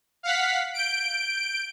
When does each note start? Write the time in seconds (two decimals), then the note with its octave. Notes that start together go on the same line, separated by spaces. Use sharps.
0.23 F5 F#5 B6
0.74 G6 D7